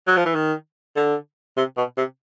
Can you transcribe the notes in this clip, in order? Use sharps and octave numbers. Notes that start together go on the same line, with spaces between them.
F#3
F3
E3
D#3
D3
C3
B2
C3